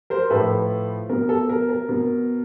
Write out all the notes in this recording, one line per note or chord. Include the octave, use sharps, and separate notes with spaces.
A#4 C5
A2 F3 A4 B4
B2 A#4
A4
A#4
A#4
B2